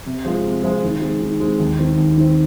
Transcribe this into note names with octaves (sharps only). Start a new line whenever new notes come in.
C3
F3 G#3 F4 C5
C3
F3 G#3 F4 C5
D#3
G#3 C4
D#3
G#3 C4
D#2
D#3 C4
D#2
D#3 C4